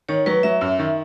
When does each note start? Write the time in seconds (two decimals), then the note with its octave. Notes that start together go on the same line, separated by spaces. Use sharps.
0.09 D#3 C#5
0.26 F#3 B4
0.43 F#3 E5
0.61 F#2
0.79 D#3